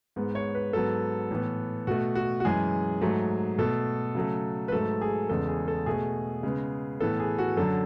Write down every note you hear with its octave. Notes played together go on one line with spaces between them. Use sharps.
G#2 G#3 B3
C#5
B4
G#2 F#3 B3 A4
A2 E3 B3
B2 A3 F#4
F#4
F#4
F#2 E3 G#3 G#4
G#2 F#3 A3
B2 A3 A4
C#3 F#3 A3
B4
G#2 F#3 A3 A4
G#4
E2 C#3 G#3 B3 A4
G#4
A4
B2 A3 G#4
C#3 G#3 B3
A2 E3 B3 A4
G#4
F#4
F#2 D3 F#3 A4